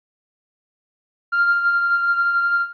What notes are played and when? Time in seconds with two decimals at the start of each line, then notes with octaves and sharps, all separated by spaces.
1.32 F6